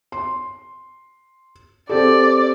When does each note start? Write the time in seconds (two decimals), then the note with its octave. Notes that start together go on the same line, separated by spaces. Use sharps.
0.12 C6
1.89 C4 G4 A4 D5